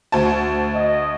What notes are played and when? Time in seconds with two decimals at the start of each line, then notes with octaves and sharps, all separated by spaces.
0.12 D2 C5 A5
0.75 D#5